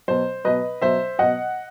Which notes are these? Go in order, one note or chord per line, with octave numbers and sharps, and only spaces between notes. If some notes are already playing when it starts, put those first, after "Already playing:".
B2 F#3 C5
B2 F#3 B4 D#5
B2 F#3 C5 E5
B2 F#3 D#5 F#5